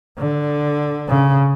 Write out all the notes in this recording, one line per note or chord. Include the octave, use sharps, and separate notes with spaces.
D3
C#3